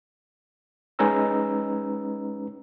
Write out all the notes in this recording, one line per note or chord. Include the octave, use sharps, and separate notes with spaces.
G#3 C#4 D#4 B4 A#5 E6